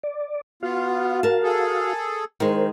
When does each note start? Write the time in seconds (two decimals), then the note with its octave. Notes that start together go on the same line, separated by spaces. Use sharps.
0.03 D5
0.63 B3 F4 F#4 F5
1.23 A#4 A5
1.43 G#4 A4
2.40 D#3 G#3 A#4 C5